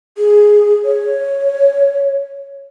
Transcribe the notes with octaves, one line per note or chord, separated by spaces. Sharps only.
G#4
C#5